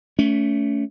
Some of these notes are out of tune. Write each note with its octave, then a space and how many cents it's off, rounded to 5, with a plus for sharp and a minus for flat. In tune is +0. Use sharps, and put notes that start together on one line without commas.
A3 +0 C#4 +30